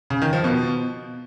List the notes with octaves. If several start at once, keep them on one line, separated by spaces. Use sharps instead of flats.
C#3
D#3
F3
B2